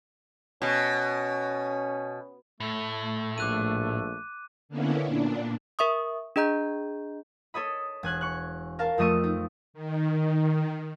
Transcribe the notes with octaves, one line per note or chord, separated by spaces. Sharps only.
B2 C#4
A2 A3
A#1 D6 F#6 D#7
D3 A#3 B3 C#4 E4
A#2 D4
A#4 E5 C#6 D#6
D4 G#4 D#5 A#5 G6
A4 C#5 D#5 B5
E1 G#5 F#6 G#6
C#6 F#6
A#4 F5 A5
F2 F3 A3 D#5 C#6 D#7
D#4
D#3